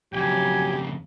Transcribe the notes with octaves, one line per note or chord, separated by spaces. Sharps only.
F2 C#3 F#3 G4 G#5